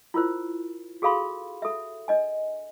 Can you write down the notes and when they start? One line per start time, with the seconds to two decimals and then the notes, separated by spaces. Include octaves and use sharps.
0.14 E4 F4 A#4 C5
1.02 F#4 G#4 A4 F5 B5 C6
1.62 A4 E5
2.08 D4 D#5 G#5